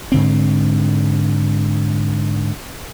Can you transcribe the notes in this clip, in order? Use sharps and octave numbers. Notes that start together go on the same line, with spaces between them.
G#2 D3 C4